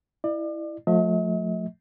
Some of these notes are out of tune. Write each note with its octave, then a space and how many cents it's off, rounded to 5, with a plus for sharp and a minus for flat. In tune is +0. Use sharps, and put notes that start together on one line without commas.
E4 +0 D5 +35
F3 +35 A3 +0 D#5 +45